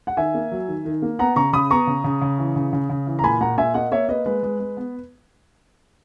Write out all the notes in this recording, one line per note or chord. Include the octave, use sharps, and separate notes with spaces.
F#5
D#3 E5 G#5
A#3
F#3
D#3
D#3
A#3
B3 F#5 A#5
C#3 A#5 C#6
C#3 B5 D#6
B3 A#5 C#6
C#3
C#3
C#3
E3
C#3
C#3
C#3
E3
A#5
A#2 G#5 B5
A#2 F#5 A#5
A#2 E5 G#5
A#3 D#5 F#5
A#3 C#5 E5
A#3 B4 D#5
G#3 B4
G#3
G#3
B3